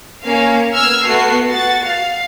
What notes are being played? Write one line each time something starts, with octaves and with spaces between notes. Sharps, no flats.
A#3 C#4 F5
B3 E6 F6 G#6
A3 B3 F#4 C7
F#4 A6
F5